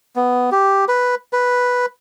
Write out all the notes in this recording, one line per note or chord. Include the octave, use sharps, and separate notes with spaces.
B3
G4
B4
B4